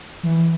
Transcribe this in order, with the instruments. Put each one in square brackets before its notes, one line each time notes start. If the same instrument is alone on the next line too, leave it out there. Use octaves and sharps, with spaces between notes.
[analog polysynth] E3